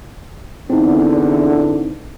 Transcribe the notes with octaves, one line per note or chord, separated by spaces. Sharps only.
E2 D3 C4 D#4